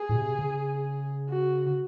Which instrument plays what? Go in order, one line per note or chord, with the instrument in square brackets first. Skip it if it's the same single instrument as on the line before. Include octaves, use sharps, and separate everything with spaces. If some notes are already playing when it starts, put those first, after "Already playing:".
Already playing: [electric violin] G#4
[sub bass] A2
C3
C#3
[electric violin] F#4